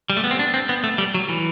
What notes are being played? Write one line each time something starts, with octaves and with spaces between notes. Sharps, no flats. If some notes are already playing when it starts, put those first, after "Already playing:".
G3
A3
B3
C4
D4
C4
B3
A3
G3
F#3
E3